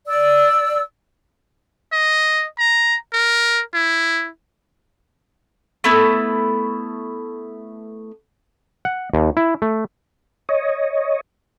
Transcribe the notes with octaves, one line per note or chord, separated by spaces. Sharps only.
D5 E6
D#5
A#5
A#4
E4
A3 B3 E4
F#5
D#2
E4
A3
C#5 D#5